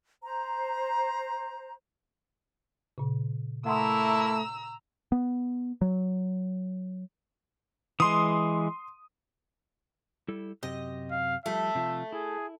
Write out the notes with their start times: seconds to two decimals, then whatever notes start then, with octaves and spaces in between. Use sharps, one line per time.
0.23 C5 A#5
2.98 A#2 C#3
3.66 A3 A#3 E4 F#5 A#5 C6 D#6 E6
5.12 B3
5.81 F#3
8.00 E3 G#3 C6 D#6
10.28 G3 E4 A4
10.63 F#2 C3 G4 D#5
11.11 F5
11.46 F3 G3 A3 E5
11.75 C3 F3 F4
12.12 E4 G#4